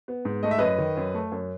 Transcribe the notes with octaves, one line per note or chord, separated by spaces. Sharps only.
B3
G#2
A3 D#5
E5
F#2 B4 D#5
D#3
F#2
A3
F#2